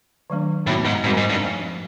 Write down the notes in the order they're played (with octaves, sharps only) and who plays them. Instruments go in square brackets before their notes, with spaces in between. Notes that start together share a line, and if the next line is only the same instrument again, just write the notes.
[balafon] D#3 F#3 A3 D4
[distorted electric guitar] A2 [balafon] B3 D#4 F#4
[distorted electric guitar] G#2
[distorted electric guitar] G#2 [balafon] G3 C4 D#4 F#4 A#4
[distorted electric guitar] G#2
G2
[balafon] F3 A3 C4